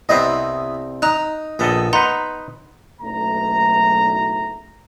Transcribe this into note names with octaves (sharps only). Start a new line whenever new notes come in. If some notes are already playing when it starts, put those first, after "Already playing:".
C2 B3 C4 E4 D#5
D#4 A#5 F#6
A#1 B3 A4 D#5
D#4 B4 F#5 A#5 C6
F#1 B1 A3 A#5